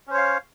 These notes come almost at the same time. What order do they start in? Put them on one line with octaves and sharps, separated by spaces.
C#4 C5 C#5 F5